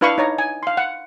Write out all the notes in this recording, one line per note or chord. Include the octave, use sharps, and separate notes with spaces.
D4 E4 B4 F5 B5 C#6
D#4 C#5 A#5
G#5
F5 C6
F#5